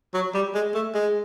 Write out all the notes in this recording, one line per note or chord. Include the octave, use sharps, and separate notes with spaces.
F#3
G3
G#3
A3
G#3